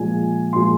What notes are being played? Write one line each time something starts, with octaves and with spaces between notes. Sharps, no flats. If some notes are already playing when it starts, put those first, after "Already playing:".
Already playing: A#2 F3 G#3 G#5
A#2 F3 G#3 C6